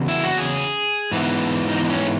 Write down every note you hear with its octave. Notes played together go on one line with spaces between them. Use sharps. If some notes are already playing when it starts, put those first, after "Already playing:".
Already playing: E2 C#3 F#3 B3
E4
F#4
G#4
G#2 E3 B3
D#4
D#4
C#4